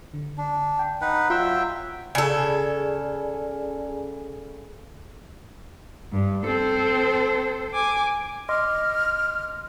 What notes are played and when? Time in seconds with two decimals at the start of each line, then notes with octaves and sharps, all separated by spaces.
0.14 D3
0.38 D4
0.79 G5
1.01 D#4 B4 F#5
1.30 F#3 F4 E5 G5 C6 E6
2.15 C#3 G#4 A4 D5 G#5
6.12 G2
6.45 C4 A4 C5
7.74 G#5 D6
8.49 D#5 C6 D6 F6